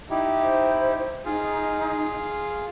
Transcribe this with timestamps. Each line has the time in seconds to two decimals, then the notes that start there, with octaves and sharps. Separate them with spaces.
0.10 D#4 E4 G4
0.43 C5
1.26 D#4 F4 G#4 F5